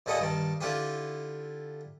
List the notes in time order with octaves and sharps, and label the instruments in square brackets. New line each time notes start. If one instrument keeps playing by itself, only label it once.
[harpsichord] D#2 A#2 A4 B4 D#5 F#5
G2 D#3 A5
D3 E4 F4 G4 B4